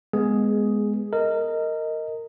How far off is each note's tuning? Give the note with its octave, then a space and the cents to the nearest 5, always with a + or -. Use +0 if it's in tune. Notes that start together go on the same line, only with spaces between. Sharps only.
G#3 +0 B3 +0 G#4 +5
A#4 -20 D#5 +10